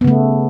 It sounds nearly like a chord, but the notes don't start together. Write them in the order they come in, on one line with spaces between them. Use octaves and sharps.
B3 C#3 A3